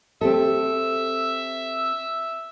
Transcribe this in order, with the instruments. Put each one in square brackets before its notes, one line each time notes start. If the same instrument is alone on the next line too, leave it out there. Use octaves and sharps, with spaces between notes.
[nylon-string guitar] C4 G4 A4 [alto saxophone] E5